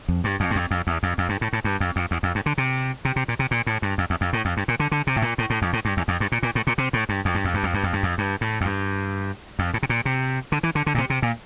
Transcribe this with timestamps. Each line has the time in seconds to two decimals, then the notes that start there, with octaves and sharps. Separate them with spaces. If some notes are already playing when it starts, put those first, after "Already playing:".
0.08 F2
0.24 G2
0.40 F2
0.51 G2
0.56 F2
0.71 F2
0.87 E2
1.03 F2
1.18 F2
1.29 G2
1.41 A2
1.53 A2
1.64 G2
1.80 F2
1.96 F2
2.11 E2
2.23 F2
2.35 G2
2.46 D3
2.58 C3
3.05 C3
3.16 C3
3.28 A#2
3.39 C3
3.51 A#2
3.67 A2
3.82 G2
3.98 F2
4.10 E2
4.21 F2
4.33 A2
4.45 F2
4.57 G2
4.68 A#2
4.80 D3
4.92 D3
5.07 C3
5.16 A2
5.22 A#2
5.38 A2
5.50 A2
5.62 F2
5.73 A2
5.85 G2
5.97 E2
6.08 F2
6.20 G2
6.32 A#2
6.43 A#2
6.55 A2
6.67 A#2
6.78 C3
6.93 A2
7.09 G2
7.25 F2
7.34 G2
7.45 F2
7.54 G2
7.63 F2
7.74 G2
7.83 F2
7.93 G2
8.03 F2
8.18 G2
8.41 A2
8.61 F2
8.65 G2
9.59 F2
9.74 A2
9.83 C3
9.89 A#2
10.05 C3
10.52 D3
10.63 E3
10.75 D3
10.86 D3
10.95 A#2
10.98 C3
11.10 C3
11.22 A#2